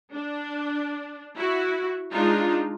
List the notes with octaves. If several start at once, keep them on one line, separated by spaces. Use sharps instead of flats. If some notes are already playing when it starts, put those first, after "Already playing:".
D4
E4 F#4
G#3 D4 D#4 F4